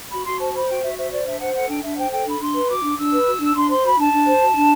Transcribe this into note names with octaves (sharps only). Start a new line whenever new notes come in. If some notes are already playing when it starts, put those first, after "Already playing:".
F#4 B5
F#4 C6
C5 A5
C5 B5
F#4 G5
F#4 E5
C5 E5
C5 D5
D4 E5
C5 F#5
A4 F#5
D4 G5
D4 E5
F#5
C5 G5
A4 G5
D4 B5
D4 C6
B4
F#4 D6
D4
D4 E6
B4
F#4
D4
D4 C6
C5 C6
F#4 B5
D4 A5
D4
C5
F#4
D4